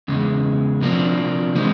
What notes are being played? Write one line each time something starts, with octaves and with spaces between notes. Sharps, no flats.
E2 C#3 G#3
C3 F3 A#3 D4
E3 G#3 C4 D#4